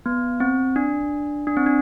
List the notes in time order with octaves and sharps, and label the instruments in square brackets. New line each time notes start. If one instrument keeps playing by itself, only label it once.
[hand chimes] B3
C4
D4
D4
C4
D4